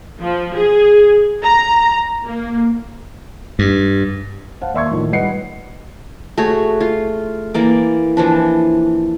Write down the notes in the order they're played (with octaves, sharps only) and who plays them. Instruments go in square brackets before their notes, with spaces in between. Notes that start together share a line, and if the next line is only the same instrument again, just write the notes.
[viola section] F3
G#4
A#5
A#3
[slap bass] G2
[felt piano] C5 F5 F#5 A5
D#2 D5 E5 C6 C#6 G#6
A2 D#3 F3
G3 B4 D#5 F#5 C7 C#7
[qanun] A3 F#4 G#4 C#5
F4
E3 A#3 D5
E3 F3 D4